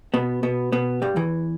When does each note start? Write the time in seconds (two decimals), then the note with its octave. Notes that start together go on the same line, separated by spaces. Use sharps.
0.14 B2 B3
0.43 B2 B3
0.72 B2 B3
1.02 G2 G3
1.16 E2 E3